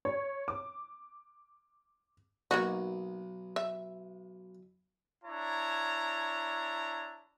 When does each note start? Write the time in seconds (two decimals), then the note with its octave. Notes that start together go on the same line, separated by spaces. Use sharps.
0.05 C#5
0.48 D6
2.51 B1 A#3 D#4 F#4
3.56 E5
5.24 D4 E4 C#5 A#5